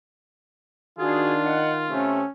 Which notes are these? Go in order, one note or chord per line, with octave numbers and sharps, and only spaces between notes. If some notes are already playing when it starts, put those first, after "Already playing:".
D#3 D4 F4 F#4 G#4
D#5 F#5
C3 A3 C#4